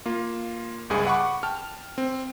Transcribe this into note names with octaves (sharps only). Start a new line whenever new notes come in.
A#3 F4
G1 C#2 G2 G#4
F#5 B5 C#6 D6
G5 A5 F6
C4